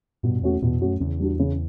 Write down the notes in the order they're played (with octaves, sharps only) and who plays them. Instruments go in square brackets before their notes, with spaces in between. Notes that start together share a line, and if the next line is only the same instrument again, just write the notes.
[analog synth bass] G2 [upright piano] B2
[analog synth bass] E2 [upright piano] A3 C#4 F#4
[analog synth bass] E2 [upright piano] B2
[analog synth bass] F#2 [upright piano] A3 C#4 F#4
[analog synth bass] E2 [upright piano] C#3
[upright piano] G3 D4 F#4
C#3